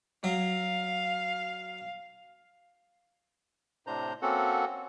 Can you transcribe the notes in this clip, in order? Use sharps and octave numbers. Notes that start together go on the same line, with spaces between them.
F#3 F5
A2 C3 D4 C5 A#5 G6
A#3 C4 C#4 F#4 A4 F#5